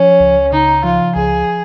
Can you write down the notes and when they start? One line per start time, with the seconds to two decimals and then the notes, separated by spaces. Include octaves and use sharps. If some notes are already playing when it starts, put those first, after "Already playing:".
Already playing: F3 C#4
0.20 C#2
0.52 C#3 D#4
0.84 F3 F4
1.15 C#2 G#4